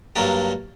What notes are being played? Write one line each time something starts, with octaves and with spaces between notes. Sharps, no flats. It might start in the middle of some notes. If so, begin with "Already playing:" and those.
G2 F#3 A#3 D4 G4